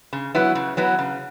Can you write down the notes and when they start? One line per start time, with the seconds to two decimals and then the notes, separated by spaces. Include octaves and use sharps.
0.13 C#3
0.35 F#3 B3 E4
0.55 C#3
0.77 F#3 B3 E4
0.99 C#3